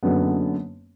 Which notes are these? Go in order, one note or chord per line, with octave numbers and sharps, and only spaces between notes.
F#1 F#2 D3 F#3 B3